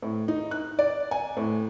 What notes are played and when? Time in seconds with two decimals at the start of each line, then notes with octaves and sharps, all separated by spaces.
0.02 A2
0.28 D#4
0.51 F#6
0.79 D5
1.11 G#5
1.37 A2